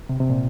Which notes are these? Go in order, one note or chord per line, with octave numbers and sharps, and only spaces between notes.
C3
C3
A#2